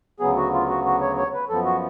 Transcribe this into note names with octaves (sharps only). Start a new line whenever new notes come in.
D2 C#3 F#3 B3 G#4
F#4
F4
F#4
F#4
C#5
C#5
B4
F#2 F3 B3 A4
F#4